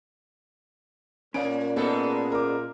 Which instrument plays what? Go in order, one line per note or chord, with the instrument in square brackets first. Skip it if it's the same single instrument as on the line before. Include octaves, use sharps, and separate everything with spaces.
[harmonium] A#2 [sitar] A#3 [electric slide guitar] C#4 C#5 D5 [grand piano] D7
[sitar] G#2 G#3 A4 [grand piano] B3
[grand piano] A#4 D6